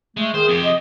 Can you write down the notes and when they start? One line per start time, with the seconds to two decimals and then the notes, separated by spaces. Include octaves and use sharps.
0.17 G#3 A3
0.34 D#3 G#4 C5
0.49 F2 G4
0.63 D#5